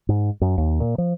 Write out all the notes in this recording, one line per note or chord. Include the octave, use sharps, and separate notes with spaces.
G#2
F#2
D#2
A#2
F3